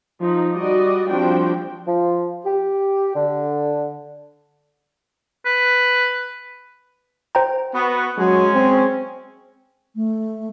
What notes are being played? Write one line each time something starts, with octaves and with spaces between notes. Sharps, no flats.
F3 D#4
G3 F#4 D5 D#5
F3 G3 C4 D4 F#4 G5
F3
G4
D3
B4
C5 G5 A#5
B3 F#4
F#3 G#3 C#4
C4
A3